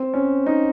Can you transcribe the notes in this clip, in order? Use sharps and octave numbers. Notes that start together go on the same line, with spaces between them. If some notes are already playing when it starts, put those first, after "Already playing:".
Already playing: C4
C#4
D#4